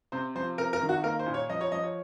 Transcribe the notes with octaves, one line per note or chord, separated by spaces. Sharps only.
C3 C5
F3 C5
C3 A#4
A#4
D#3
F#4
A#3 A#4
C5
A#2
C#5
F3 D#5
C#5
F3 D#5
C#5